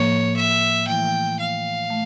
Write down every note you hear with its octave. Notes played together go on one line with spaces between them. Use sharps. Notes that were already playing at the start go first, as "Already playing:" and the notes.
Already playing: A2 F3 A#3 C#5
E5
E3 A3 E4 G5
F5
A3